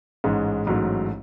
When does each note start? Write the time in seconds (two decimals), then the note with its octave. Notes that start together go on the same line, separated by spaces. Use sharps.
0.24 A1 G#2 G#3
0.66 A1 G#2 F#3 A3